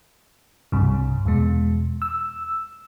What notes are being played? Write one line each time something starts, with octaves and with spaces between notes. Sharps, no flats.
C2 G2 C3
E2 B2 G#3
E6